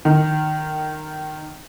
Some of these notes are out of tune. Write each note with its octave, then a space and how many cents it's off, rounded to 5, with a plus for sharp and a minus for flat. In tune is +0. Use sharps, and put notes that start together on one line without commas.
D#3 -20